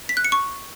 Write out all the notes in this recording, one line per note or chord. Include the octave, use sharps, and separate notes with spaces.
B6
F#6
C#7
C#6